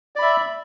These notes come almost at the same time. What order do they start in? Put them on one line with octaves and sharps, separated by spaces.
D5 B5 E5